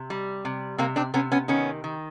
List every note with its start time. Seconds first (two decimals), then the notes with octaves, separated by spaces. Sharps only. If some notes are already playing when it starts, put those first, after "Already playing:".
Already playing: C3
0.10 G3
0.45 C3
0.78 C3 A#3 C4
0.96 C4 D4
1.14 C3 B3 C#4
1.32 B3 C#4
1.48 D#3 B3 C#4
1.84 D#3